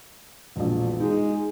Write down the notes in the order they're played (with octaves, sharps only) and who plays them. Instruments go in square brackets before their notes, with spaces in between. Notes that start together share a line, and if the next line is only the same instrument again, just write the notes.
[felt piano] E1 A#1
[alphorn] G#3 [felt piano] D#4